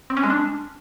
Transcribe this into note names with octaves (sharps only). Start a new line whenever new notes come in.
C4
C#4
G#3
D4